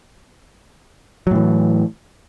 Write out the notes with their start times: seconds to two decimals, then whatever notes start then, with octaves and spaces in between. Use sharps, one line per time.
1.27 F#3
1.31 A2
1.35 E3